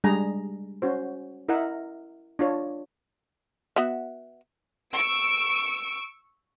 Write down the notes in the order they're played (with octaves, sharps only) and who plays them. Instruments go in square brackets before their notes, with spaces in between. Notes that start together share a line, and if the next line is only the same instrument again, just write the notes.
[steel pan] G3 G#3 D4 G#4 A#5
C#4 F#4 C5
E4 A#4 D#5 E5 F#5
D4 F4 C#5
[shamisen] B3 F#4 E5
[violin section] C#6 E6 D7